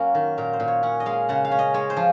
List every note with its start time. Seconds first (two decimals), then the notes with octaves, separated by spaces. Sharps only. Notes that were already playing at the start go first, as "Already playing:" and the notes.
Already playing: F#2 A#3 C#4 F#4
0.15 D#3
0.38 A#2 A#4
0.53 C5
0.60 A#2
0.68 C#5
0.83 C#4 F#5
1.00 D#5
1.06 G#3 F5
1.29 C#3 F#5
1.45 F5
1.52 C#4
1.59 D#5
1.74 G#3 C#5
1.90 C5
1.97 F3